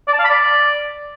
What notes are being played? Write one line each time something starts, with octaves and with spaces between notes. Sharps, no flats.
D5
A5
F5
B5
D5